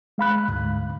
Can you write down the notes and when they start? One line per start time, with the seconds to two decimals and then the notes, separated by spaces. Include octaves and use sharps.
0.18 G#3 F5 B5 F#6
0.48 D2 G#2